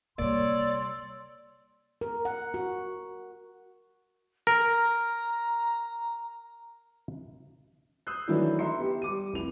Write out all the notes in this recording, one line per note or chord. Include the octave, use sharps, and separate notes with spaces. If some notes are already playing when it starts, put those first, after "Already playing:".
C3 G3 A#3 C#5 D5 C6 E6
A#4
F#5
F#4
A#4 A#5
D#6 E6 F#6 G6 C7
D#3 E3 F#3 A3 D4 E4
E5 A#5 C6 C#7
B3 G4
G3 D6 D#7
F1 E4 F7